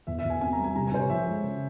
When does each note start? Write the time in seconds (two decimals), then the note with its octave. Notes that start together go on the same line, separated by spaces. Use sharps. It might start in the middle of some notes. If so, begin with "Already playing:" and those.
0.07 E2 E5
0.19 E5
0.24 E2
0.30 G#5
0.41 C4 G#5
0.52 A#5
0.58 G3
0.64 G#5
0.75 C3 A#5
0.87 G#5
0.92 C3 C5
0.99 C#5
1.10 F3 E5
1.27 G#3
1.43 C#3